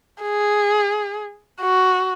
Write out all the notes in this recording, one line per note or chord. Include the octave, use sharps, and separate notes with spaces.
G#4
F#4